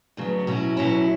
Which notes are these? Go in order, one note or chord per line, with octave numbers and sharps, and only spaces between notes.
D2 C#3 F#3 B3
B2 F#3 C#4 E4
B2 F#3 C#4 E4